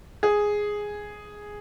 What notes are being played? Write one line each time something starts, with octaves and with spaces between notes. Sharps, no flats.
G#4